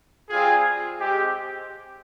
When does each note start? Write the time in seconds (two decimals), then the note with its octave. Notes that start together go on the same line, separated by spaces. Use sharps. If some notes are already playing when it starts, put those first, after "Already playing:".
0.29 G3 C4 F4 G#4
0.97 G#3 C4 G4